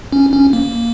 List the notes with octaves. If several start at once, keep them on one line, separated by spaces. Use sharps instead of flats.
C#4
C#4
A#3